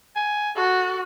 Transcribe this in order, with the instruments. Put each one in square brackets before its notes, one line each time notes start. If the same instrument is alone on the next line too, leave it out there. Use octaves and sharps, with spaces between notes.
[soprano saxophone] G#5
[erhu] F#4 [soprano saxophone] A4